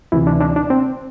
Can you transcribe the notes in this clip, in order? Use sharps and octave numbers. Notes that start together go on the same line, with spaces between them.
D2 C3 E3 E4
D4
D4
D4
C4